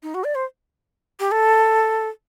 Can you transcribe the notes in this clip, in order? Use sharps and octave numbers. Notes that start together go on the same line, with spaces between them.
D#4
F#4
D5
C5
G4
A4